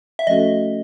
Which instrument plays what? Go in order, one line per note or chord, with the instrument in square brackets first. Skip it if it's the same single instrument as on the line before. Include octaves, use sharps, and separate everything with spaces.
[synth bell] E5
[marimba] F3 A3 C#4 F#4 A4 [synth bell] D#5